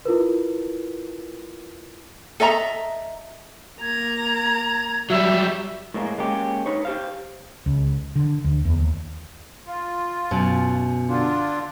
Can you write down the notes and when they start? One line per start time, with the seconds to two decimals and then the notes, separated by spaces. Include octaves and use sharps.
0.05 E4 F4 A#4 B4
2.40 A4 D#5 E5 A#5
3.81 A#3 A#5 G#6
5.10 F#3 G3 E5
5.94 A2 E3 G#3 A#3
6.18 G#3 A#3 C#4 G4
6.66 D#4 B4 C#5
6.85 G4 C5 F5
7.66 C#2
8.16 D3
8.44 D2
8.65 E2
8.78 D#2
9.67 F4
10.31 F#2 B2 G#5
11.08 D3 D4 F4